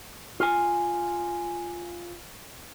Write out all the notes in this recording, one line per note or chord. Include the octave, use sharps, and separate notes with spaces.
F4 G#5